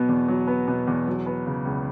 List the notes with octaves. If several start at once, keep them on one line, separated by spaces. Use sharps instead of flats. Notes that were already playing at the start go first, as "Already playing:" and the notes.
Already playing: B2 F#3 B3
E2
F#3
B3
B2
E2
F#3
B3
C#3
C#2